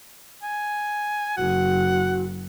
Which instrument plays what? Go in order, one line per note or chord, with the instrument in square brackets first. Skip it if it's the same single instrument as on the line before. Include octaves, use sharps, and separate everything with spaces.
[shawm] G#5
[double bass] F#1 [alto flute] F#4 [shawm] F#5